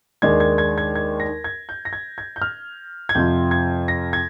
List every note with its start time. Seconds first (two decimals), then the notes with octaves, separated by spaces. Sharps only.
0.22 D#2 D#3 G#3 D4 G#6
0.40 G#6
0.58 G#6
0.78 G#6
0.96 G#6
1.20 A#6
1.44 G#6
1.69 G6
1.85 A#6
1.93 G#6
2.18 G#6
2.36 G6
2.42 F6
3.09 G#6
3.15 F2 C3 F3 G6
3.51 G#6
3.88 A#6
4.13 G#6